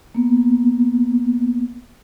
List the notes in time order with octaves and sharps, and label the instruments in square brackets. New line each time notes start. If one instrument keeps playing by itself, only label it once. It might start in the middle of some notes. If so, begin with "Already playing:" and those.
[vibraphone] A#3 B3